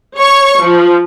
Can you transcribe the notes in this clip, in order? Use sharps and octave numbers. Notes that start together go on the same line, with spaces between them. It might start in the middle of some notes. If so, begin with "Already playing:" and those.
C#5 C#6
F3